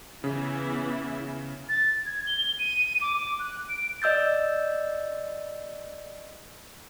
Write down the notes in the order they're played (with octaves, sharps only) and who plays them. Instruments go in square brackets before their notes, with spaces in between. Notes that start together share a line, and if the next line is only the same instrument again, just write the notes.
[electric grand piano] C#3 [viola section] E3 B3 E4
[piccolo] A6
G#6
G7
D#7
D6
D6
F#6
D7
[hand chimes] D5 D#5 E6 G6 A6